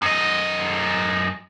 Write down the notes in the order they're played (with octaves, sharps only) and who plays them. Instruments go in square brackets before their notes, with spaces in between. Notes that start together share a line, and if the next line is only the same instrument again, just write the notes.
[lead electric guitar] F#2 D#5